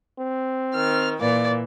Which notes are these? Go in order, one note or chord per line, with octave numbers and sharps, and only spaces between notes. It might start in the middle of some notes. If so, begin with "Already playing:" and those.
C4
D#3 F6
A#2 E3 A#3 D5